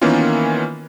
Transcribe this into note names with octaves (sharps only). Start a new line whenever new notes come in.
D#3 E3 A#3 B3 C#4 F4